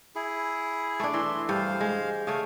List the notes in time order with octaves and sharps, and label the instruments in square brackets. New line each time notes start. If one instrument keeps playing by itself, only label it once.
[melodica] E4 G#4
[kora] A3 D4
[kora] E3 [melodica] E5 C6
[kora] G2 [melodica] C5 F5
[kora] G#3
[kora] C#3 A3 [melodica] F5